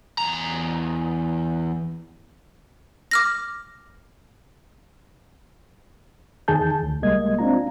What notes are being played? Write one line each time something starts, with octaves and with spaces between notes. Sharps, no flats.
E2 A#5
D6 F6 A#6
E2 D#3 G#4 A5 G6
D2
C2 G3 G#3 A#3 D#5 G#6
C4 D4 F4 A#5